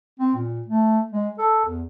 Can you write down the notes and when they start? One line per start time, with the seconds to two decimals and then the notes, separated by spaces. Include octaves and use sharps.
0.20 C4
0.35 A#2
0.68 A3
1.12 G#3
1.38 A4
1.65 E2